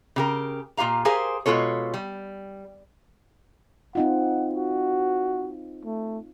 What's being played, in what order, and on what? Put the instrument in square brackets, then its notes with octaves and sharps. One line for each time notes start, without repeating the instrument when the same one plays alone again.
[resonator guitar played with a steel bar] C#3 G4 A#4
A#2 F4 G4 F5 A#5
G4 G#4 A#4 C5 F5 G#5
B2 G#3 F4 A4 C#5
G3
[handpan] C4 D#4 F4 [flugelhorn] F#5
[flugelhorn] F#4
A3